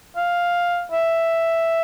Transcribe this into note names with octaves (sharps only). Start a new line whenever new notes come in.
F5
E5